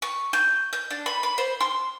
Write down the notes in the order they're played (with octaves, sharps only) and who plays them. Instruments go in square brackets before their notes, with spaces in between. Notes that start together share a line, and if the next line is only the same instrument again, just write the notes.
[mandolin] C#6
G6
G6
D4
B5
B5
C5
C6